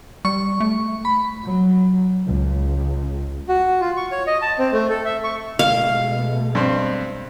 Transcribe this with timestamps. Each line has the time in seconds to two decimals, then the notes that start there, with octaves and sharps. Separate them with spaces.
0.25 G3 C#6
0.60 A3
1.05 B5
1.45 F#3
2.28 C#2
3.49 F#4
3.81 F4
3.97 C#6
4.12 C#5
4.27 D#5
4.42 A5
4.58 C4
4.72 A3
4.90 A4
5.05 E5
5.24 C#6
5.59 B2 G#3 A3 F5
6.55 G2 C4